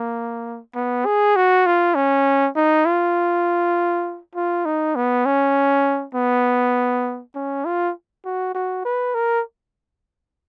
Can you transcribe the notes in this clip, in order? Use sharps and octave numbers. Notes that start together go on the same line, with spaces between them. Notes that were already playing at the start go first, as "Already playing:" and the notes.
Already playing: A#3
B3
G#4
F#4
F4
C#4
D#4
F4
F4
D#4
B3
C#4
B3
C#4
F4
F#4
F#4
B4
A#4